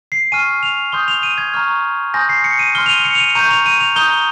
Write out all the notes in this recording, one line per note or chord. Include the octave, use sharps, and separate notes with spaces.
C7
G#5 C#6 F6 D#7
F7
C6 D#6 G6 G7
F7
D#7
G#6
A#5 C#6 F6
G#5 C6 D#6 G6 A#6
C7
C#7
D#7
C6 F6 G7
F7
D#7
C#7
F7
D#7
A#5 C#6 G6 D#7
F7
D#7
F7
A#5 D#6 G6 G7